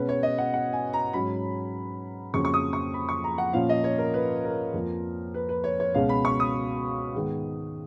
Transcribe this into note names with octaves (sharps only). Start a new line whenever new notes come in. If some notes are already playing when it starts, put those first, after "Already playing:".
Already playing: B2 G#3 C#4 B4
C#5
D#5
F#5
F#5
G#5
A#5
G#2 F#3 C#4 B5
F2 C#3 F#3 A#3 C#4 C#6
C#6
D#6
C#6
B5
C#6
A#5
F#5
A#2 F3 A#3 C#4 F5
D#5
C#5
A#4
B4
A#4
F2 F3 A#3
B4
B4
C#5
C#5
C#2 B2 G#3 C#4 F5
B5
C#6
D#6
G#2 D#3 G#3 B3